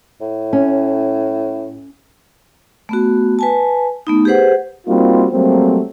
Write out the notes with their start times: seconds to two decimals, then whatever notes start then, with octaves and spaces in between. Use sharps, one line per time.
0.21 A2
0.53 C#4
2.89 A3 B3 F#4
3.39 B4 G#5 A5
4.07 A3 B3 D#4
4.25 G4 G#4 B4 C5 F#5
4.87 G3 A#3 C4 D#4 F4 F#4
5.32 F#3 G3 A3 A#3 C4